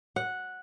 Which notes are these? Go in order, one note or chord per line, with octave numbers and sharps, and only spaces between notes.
F#5